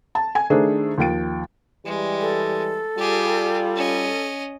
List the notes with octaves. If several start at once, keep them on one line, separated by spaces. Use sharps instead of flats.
A5
G#5
D#3 A3 D4 G#4 A#4 C5
D#2 F3 G5 A6 D7
E3 G3 G#3
A4
G3 F4 G4 G#4
C#4 D#5